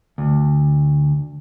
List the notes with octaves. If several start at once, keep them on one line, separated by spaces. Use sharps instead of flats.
D2